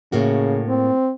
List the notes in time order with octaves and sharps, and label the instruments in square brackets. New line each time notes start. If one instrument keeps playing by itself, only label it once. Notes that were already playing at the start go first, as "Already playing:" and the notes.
[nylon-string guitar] A2 A#3 F#4 [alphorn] C#3
[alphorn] C4